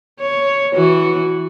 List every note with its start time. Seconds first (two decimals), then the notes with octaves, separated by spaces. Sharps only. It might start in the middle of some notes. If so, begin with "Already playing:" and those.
0.20 C#5
0.74 E3 F#4